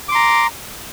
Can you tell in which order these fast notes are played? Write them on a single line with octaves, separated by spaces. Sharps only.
D6 C6 A#5